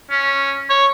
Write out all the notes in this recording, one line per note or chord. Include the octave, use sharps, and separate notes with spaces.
C#4
C#5